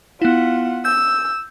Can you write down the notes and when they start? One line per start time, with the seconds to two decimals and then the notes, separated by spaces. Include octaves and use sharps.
0.22 B3 E4 F4 F#5
0.85 E6 G6